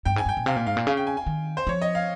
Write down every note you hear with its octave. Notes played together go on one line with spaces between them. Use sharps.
G2 G5
G#2 G#5
G2
G5
A#2
C3 F5
A#2
G#2 F5
A#2
C#3 F5
G5
G#5
G#5
D#3
C5
F3 C#5
D#5
F5